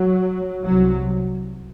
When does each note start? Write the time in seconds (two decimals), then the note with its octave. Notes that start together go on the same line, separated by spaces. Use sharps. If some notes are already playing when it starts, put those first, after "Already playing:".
Already playing: F#3
0.65 C2 C3 F#3